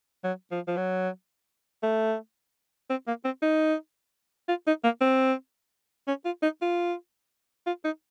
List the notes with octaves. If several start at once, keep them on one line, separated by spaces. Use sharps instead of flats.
F#3
F3
F3
F#3
A3
C4
A#3
C4
D#4
F4
D#4
A#3
C4
C#4
F4
D#4
F4
F4
D#4